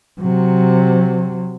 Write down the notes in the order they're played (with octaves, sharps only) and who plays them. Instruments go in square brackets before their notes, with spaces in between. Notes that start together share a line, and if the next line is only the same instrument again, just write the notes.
[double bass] C3 F#3